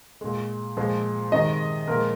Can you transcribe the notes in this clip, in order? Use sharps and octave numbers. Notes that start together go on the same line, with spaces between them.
A#2 G#3
A#2 F3 G#3
C3 D#3 G#3 D#5
A#2 F3 G#3 A#4